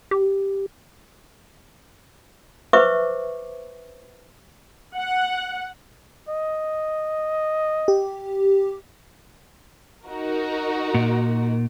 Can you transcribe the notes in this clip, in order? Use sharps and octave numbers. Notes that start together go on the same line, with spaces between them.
G4
B4 C5 E5 C#6 D6
F#5
D#5
G4
D#4 F#4 A#4
A#2